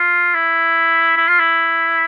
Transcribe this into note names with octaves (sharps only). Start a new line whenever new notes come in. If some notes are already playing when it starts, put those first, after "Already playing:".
Already playing: F4
E4
E4
F4
E4